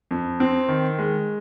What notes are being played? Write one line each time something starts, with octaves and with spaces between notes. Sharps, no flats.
F2
C4
D#3
G#3